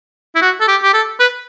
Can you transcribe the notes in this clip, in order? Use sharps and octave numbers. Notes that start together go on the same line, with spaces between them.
E4
F#4
A4
G4
G4
A4
B4